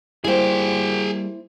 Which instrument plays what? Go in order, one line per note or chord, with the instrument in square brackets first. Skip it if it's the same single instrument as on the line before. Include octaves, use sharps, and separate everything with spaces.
[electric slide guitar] G3 A#3 [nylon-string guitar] E4 C5 [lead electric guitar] G#4 G5